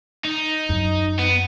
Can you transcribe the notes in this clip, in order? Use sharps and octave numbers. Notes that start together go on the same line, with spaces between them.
D#4
F#2
B3